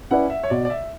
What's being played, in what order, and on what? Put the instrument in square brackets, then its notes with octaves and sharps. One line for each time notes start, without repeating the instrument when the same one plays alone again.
[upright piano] C#4 E4 B4 D5 [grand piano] F#5
[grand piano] E5
C#5
[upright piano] B2 [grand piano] D5
[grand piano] D5
E5